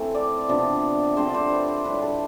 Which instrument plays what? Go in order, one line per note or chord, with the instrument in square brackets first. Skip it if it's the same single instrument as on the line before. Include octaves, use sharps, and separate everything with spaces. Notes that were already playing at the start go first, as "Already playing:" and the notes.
Already playing: [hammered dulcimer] A2 E3 A3 C4 A4
D5
C3 F3 B3 D4
D3 A3 C4 C5
D5
C5
B4
C5
A2 G3 D4 B4
A4